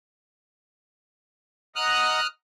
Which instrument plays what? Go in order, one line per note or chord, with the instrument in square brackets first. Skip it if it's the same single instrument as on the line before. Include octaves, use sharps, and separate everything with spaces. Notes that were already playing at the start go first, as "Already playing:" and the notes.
[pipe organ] D#5 F#5 A#5 [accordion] D#6 F6 F#6